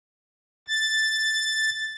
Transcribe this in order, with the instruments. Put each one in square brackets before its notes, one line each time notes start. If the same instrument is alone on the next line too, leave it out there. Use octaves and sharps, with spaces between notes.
[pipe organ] A6